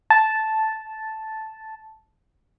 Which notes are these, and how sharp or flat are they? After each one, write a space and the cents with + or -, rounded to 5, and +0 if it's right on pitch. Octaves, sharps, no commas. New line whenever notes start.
A5 -5